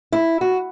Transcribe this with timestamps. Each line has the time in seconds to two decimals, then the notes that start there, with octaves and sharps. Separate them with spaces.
0.12 E4
0.41 F#4